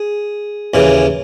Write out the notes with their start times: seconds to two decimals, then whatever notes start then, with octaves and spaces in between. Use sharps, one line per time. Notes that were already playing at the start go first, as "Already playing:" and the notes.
Already playing: G#4
0.74 D#2 C#3 E3